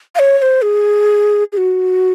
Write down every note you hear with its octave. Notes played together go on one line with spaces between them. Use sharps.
F5
C#5
C#5
C5
G#4
G#4
F#4